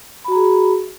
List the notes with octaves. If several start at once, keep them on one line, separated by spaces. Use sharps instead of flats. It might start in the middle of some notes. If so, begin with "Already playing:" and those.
F#4 G#4 A#5 B5